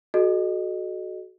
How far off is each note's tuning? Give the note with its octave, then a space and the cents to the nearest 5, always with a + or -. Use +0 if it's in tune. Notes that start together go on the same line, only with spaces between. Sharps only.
F#4 +0 A4 -40 D#5 -20